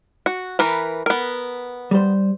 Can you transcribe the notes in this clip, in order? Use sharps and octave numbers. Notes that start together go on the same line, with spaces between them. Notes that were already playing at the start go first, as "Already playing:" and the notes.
F#4
E3 A#4 B4
B3 A#4
G3 C5